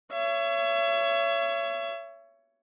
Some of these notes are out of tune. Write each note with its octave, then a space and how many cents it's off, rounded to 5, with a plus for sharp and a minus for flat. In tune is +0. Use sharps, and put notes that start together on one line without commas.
C#5 +15 E5 +35